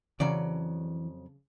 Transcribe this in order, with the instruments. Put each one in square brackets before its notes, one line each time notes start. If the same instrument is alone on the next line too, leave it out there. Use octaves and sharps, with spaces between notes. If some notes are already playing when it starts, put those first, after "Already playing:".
[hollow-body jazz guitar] F2 F#3 D5 [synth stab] C#3 [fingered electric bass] E3